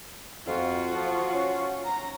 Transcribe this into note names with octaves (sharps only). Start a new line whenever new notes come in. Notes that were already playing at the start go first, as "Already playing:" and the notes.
F2 F4 F#4
F3
C#4
A#5